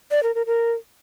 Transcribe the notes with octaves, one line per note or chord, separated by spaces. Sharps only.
D5
A#4
A#4
A#4